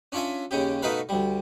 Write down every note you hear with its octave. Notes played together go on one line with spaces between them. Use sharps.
C#4 D4 F4 E5 G#5
D#2 C#3 C#4 G4
B2 A3 D#4 A#4 B4 F5
D2 G3